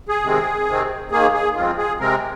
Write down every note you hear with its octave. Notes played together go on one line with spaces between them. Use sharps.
G#4
C3 D#3 G#3 C4
C3 D#3 C4
D#2 D#3 A#3 G#4
G#4
F2 F3 G#3 C4 F4
G#4
C3 G#3 C4 A#4